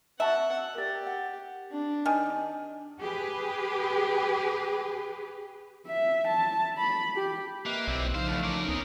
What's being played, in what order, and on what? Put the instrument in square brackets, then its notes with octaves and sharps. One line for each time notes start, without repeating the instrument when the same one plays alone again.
[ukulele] F#4 A5 B5 [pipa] E5 [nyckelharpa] F#5
[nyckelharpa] G4 [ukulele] A#4 D5
[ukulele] F#5
[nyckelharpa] D4
[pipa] D#3 [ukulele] G4 G#5 A5
[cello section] G4 G#4 B4
[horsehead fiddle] E5
A5
B5
G4
[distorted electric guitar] A#3 [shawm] B4 [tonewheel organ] D#5 E5 D6
[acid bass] B1 [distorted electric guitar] A#2 C4 [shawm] E4
[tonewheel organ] C#3 F3 D#4 [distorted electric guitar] C5 [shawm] F5
[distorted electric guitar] E2 G2 [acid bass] A3
[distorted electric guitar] C#4 A#4 [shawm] D6
[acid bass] C#2 [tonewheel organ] B3 [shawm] D#4